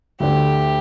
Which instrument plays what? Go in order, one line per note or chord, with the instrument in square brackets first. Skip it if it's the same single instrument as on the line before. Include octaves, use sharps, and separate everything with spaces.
[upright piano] D2 D3 A3 D4 [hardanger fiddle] G4